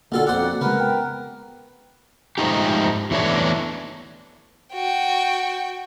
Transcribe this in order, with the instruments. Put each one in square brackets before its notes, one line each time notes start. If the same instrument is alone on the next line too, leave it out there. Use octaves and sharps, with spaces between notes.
[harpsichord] B1 F4 A4 [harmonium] D3 [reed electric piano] A#3 F#4
[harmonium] F2 F#5 [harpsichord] D4 C5
[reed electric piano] C#3 G#3 [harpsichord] B3 [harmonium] A#4 B4
[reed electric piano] G5
[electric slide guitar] G#2 F3 A3 D#4 G4
E2 E3 A3 D4 C#5
[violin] F#4 G5